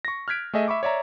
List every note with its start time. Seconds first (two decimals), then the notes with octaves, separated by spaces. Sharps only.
0.05 C#6 A#6
0.28 F6 F#6 G#6 B6 D7
0.53 A3 G#4 D#5 E5
0.68 E5 B5 C#6 D6
0.83 C#5 D5 E5 A#5